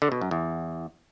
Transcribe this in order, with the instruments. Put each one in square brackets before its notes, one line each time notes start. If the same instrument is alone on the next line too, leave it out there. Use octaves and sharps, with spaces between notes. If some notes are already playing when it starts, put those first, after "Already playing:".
[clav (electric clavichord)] D3
B2
F#2
E2